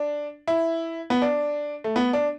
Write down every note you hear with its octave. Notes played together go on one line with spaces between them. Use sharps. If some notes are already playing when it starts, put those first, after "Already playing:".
Already playing: D4
E4
B3
D4
A3
B3
D4